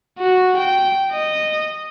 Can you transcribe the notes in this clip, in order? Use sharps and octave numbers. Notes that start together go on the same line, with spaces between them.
F#4
G5
D#5